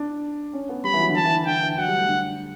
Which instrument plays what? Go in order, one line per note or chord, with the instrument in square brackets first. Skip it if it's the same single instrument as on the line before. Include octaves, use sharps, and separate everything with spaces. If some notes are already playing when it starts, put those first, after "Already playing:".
Already playing: [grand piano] D4
C#4
B3
[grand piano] G3 [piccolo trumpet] B5
[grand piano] E3
F#3
D3
[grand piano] E3 [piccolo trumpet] A5
[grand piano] E3
D3
[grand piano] D3 [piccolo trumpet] G5
[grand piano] E3
[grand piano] F#3 [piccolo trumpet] F#5
[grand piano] G3
A3
D3